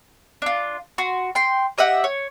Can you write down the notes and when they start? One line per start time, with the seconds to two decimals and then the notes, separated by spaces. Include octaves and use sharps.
0.42 D4 F4
0.98 F#4 C6
1.35 G5 C6
1.78 G4 D#5 E5 F#5
2.04 C#5